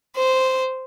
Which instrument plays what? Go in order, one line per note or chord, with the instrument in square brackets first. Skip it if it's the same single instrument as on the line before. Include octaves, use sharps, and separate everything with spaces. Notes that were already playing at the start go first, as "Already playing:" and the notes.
[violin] C5